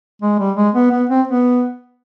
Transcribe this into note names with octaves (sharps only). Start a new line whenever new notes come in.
G#3
G3
G#3
B3
B3
C4
B3